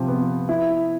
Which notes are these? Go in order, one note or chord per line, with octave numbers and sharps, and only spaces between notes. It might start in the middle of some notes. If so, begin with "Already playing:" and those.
Already playing: C3 F3
B3
E4